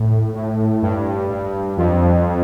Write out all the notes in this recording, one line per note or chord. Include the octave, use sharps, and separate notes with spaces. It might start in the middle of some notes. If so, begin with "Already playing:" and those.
Already playing: A2
A2
G2
G2
F2